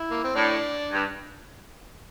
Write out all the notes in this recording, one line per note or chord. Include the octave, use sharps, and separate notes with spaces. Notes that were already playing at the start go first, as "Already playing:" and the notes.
Already playing: E4
A#3
C4
A2 D4
G2